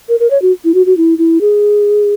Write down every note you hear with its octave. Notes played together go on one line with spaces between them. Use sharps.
A#4
A#4
C#5
F#4
E4
F#4
F#4
E4
E4
G#4